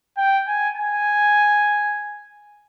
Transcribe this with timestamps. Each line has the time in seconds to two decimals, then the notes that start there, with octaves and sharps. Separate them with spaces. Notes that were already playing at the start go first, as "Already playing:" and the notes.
0.17 G5
0.47 G#5
0.76 G#5